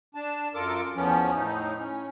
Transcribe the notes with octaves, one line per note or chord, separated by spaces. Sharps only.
D4 A5
F#2 F4 A4 A#4 D6
E2 F3 B3 C#4
A2 D#4
C#4